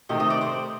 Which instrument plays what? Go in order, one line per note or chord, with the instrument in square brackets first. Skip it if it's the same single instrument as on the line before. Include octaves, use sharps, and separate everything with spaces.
[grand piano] C3 D#3 A3 C4 G4 [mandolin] D#5
[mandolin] D#5
D5
C5